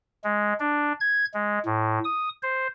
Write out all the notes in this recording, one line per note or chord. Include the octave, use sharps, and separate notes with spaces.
G#3
D4
G#6
G#3
A2
D#6
C5